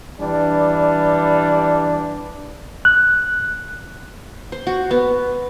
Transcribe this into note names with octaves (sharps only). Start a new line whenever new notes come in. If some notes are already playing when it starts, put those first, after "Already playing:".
E3 G3 D4
F#6
C5
F#4
B3